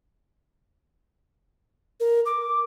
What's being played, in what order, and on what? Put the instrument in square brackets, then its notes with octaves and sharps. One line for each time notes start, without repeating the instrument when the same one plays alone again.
[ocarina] A#4
D6